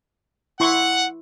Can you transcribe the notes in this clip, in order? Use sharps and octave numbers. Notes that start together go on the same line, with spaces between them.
E4 F#5 C6 C#6